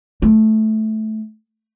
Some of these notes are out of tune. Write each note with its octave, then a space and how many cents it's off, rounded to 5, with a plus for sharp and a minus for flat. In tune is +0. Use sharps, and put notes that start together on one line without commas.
A3 -10